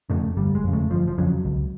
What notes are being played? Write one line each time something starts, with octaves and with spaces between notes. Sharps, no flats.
F2 C#3 A3
G1 G3
G#3
F2 C#3
A3
G1 F3
F3
F2 C#3 F#3
C#2